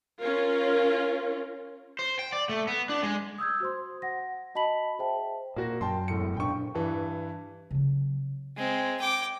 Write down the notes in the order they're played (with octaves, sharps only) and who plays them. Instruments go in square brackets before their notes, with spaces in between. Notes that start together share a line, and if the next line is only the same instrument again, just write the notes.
[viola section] C#4 F4 A#4
[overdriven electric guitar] C5
G5
D5
A3
B3
D4
G#3
[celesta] D#6 E6 G6 G#6
F#4 C5 C6
F#5 A#6
F#4 D#5 A5 B5 B6 F#7
G#4 C5 E5 G5 A5
[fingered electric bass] A#2 [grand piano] A#3 F#4 A#6
[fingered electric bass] F#2 [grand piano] G5 A5 C6
[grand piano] E1 A2 C#7
[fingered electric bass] A#2 D4 [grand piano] G5 C#6
[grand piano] G2 E3
[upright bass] C#3 F#3
[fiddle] G#3 C4
G5 D6